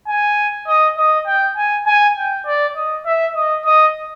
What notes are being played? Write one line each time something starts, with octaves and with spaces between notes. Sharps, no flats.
G#5
D#5
D#5
G5
G#5
G#5
G5
D5
D#5
E5
D#5
D#5